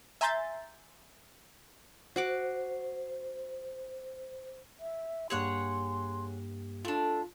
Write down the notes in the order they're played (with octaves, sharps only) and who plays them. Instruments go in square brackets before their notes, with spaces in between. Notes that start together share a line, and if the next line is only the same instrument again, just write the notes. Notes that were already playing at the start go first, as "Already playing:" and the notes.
[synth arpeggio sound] E5 G#5 A#5 C6 G6 A6
[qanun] F#4 F#5 D6 [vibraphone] C5
[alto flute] E5
[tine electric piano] G2 A#3 G4 [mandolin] G#4 C#5 F#5 [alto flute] C6
[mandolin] A3 D4 [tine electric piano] F4 [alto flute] A4